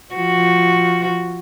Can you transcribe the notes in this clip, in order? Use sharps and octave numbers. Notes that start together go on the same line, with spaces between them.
F3 F#4